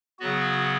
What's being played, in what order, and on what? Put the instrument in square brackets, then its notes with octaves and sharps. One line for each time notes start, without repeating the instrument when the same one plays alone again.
[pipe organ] C#3 F#3 B3 F#4